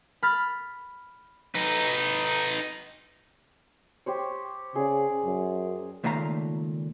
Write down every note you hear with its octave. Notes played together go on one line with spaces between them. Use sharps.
B5 F6 A6
D#4 B4
G4 C5 C#5
C#3 G#4 D5
F#2
C#2 A#2 D#3 A3 F5 A#5